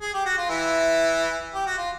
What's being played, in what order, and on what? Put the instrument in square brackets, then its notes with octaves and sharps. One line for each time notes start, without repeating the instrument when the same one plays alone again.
[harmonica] G#4
G4
F#4
F4
E3 E4
G4
F#4
F4